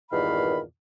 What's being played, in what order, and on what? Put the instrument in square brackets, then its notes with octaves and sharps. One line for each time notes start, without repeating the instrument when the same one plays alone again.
[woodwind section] E2 G2 A#2 D#3 F5 B5